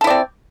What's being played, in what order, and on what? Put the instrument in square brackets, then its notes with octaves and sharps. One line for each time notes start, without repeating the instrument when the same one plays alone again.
[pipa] A4
E4
D5
C4